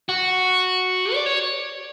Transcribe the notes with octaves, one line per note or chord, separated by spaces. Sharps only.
F#4
D5
C#5